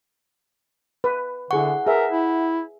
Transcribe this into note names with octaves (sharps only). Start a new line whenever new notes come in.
B4
D3 E4 G#4 F#5 C#6
G#4 A#4 B4 E5
E4